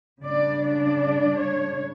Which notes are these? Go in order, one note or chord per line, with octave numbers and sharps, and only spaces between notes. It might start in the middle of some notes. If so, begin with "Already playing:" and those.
C#3 G3 D4 D5
D5
C#5